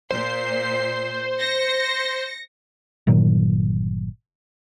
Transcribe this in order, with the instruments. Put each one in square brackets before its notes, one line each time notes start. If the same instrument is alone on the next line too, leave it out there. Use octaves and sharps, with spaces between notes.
[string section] A#2 C7 [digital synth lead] C5
[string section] A#6 C#7
[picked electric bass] G1 A#2 D#3 F#3